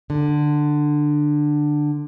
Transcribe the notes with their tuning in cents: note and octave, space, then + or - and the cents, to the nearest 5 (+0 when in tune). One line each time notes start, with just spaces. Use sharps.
D3 +15